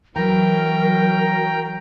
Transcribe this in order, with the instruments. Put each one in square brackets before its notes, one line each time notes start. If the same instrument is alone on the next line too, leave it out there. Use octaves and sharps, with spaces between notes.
[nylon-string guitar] E3 [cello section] F#3 [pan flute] A#4 [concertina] G5 A#5